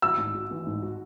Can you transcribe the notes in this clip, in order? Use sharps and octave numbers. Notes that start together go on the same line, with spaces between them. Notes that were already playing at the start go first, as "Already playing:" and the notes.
F#4 E6
G#2
F#4
E3
G#2
F#4